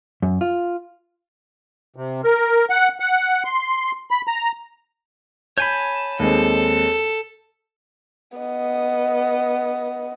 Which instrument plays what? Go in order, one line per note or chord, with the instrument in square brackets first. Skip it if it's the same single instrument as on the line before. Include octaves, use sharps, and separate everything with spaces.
[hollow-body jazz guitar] F#2
F4
[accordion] C3
A#4
F#5
F#5
C6
B5
A#5
[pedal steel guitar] C#5 G#5 B5 [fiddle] A5 [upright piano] G6
[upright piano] D#2 G#3 C4 [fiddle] A4
[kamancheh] B3 D#5